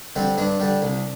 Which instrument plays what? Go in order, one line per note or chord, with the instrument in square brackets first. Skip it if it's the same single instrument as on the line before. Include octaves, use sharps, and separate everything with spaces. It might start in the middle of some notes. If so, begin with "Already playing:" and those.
[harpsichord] D3 G3 C4
G2 D4
D3 G3
C2